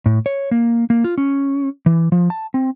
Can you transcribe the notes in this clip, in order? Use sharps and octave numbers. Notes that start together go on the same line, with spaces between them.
A2
C#5
A#3
A#3
F4
C#4
E3
F3
A5
C4